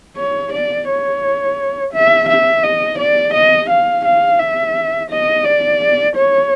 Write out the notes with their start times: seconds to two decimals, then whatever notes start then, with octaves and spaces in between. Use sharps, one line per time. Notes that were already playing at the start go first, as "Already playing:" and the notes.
0.17 C#5
0.53 D5
0.88 C#5
1.93 E5
2.29 E5
2.63 D#5
2.98 D5
3.34 D#5
3.70 F5
4.05 F5
4.39 E5
5.10 D#5
5.45 D5
6.16 C#5